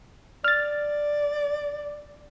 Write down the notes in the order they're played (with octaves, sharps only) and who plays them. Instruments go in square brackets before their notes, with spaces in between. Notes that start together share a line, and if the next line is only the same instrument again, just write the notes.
[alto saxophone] D5 [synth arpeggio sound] F6 A6